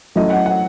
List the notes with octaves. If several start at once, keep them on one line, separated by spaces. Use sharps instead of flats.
F#3 A3 C#4 E4 D#5
F#5
F#5